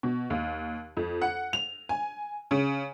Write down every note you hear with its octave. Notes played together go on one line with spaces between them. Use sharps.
B2
D#2
F2
F#5
F7
G#5
C#3